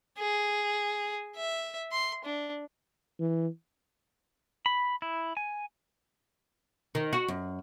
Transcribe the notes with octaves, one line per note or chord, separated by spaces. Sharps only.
G#4
E5
C6
D4
E3
B5
E4
G#5
D#3
F#4
F#2